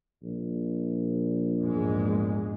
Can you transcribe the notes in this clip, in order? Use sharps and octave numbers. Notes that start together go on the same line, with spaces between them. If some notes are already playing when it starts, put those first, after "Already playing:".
A#1
E2 G#2 G#3